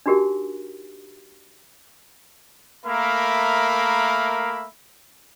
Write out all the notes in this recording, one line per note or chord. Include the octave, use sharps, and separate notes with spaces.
D4 D#4 F#4 G4 A#4
A3 A#3 A#4 E5 F5 B5